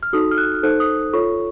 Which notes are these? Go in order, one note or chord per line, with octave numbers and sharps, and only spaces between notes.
F6
D#4 F#4 A4 D#6
F6
F#6
F6
D#4 A4 C5 F#6
D#6
F4 A4 C#5 C#6